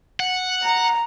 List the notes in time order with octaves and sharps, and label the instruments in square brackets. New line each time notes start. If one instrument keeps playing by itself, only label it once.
[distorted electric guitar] F#5
[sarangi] A#5